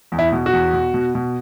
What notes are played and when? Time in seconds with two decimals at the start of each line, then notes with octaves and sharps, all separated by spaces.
0.12 E2
0.19 E4
0.32 B2
0.46 F#4
0.53 E2
0.73 B2
0.94 B2
1.15 B2